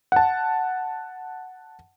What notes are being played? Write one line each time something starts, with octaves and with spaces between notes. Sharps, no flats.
F#5 A5